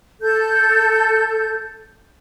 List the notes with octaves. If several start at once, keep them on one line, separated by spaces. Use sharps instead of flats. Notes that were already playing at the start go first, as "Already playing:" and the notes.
A4 G6